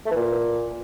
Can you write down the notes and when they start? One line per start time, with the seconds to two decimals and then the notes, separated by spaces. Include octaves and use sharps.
0.06 A3
0.11 E3
0.16 A#2